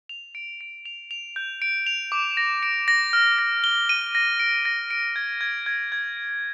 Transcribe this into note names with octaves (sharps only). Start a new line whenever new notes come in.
F7
D7
D7
F7
F7
G6
D7
F7
D6
A#6
D7
A#6
F6
A#6
G7
D#7
A#6
D7
A#6
D7
G#6
G#6
G#6
G#6
D7